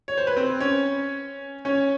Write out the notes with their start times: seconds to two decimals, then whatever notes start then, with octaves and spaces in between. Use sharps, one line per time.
0.08 C#5
0.18 C5
0.27 B4
0.36 C4 C5
0.61 C#4 C#5
1.65 C#4 C#5